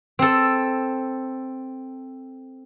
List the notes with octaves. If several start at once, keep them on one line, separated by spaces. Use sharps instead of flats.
C4 A4